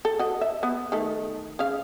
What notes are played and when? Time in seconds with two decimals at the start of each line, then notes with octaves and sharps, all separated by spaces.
0.05 A4
0.19 F#4 D#5
0.41 E5
0.63 B3
0.92 D#3 A3
1.59 C#3 F5